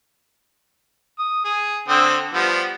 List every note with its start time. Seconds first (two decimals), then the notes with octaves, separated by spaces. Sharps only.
1.19 D#6
1.45 G#4
1.88 D3 C4 D#6
2.34 F3 G3 B3